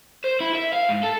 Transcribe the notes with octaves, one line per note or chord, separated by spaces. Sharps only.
C5
E4
E5
F5
G#2
A4